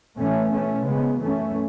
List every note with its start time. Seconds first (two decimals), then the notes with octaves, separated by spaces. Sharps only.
0.15 A2 E3 A3 C#4
0.49 B2 A3 C#4
0.84 C#3 G#3 B3
1.18 F#2 E3 A3 C#4